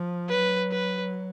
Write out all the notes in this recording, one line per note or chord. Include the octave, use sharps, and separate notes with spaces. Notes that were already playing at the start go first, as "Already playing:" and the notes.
Already playing: F3
F#3 B4
B4